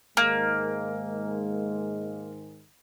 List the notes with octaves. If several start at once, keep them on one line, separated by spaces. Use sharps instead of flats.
G#2 D#3 G#3 A#3